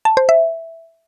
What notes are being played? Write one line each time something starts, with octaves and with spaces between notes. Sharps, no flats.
A5
C5
E5